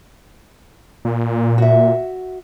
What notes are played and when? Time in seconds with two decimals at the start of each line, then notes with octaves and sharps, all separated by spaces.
1.05 A#2
1.58 F#4 E5